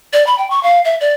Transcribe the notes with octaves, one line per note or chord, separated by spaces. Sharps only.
D5
B5
G5
C#6
F5
E5
D5